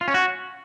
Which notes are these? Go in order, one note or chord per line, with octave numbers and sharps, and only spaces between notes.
F4
C#4
F#4